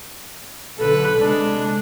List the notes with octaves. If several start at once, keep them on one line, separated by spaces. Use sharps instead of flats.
B1 D3 A4 B4
C3 G#3 D4